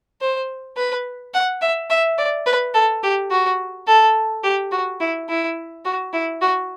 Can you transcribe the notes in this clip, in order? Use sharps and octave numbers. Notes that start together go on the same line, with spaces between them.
C5
B4
F#5
E5
E5
D5
B4
A4
G4
F#4
A4
G4
F#4
E4
E4
F#4
E4
F#4